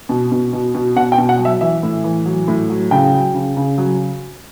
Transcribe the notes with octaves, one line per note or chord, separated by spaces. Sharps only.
B2
B2
B2
B2
B2 F#5
G5
B2
F#5
F#3
E5
E3 E5
A2
E3
F#3
A2
F#3
C#3 G5
F#3
C#3
C#3
F#3